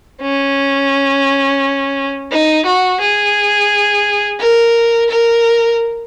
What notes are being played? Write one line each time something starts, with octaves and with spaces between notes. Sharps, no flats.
C#4
D#4
F#4
G#4
A#4
A#4